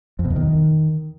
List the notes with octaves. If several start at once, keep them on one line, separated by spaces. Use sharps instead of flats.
F2
B2
E2
D#3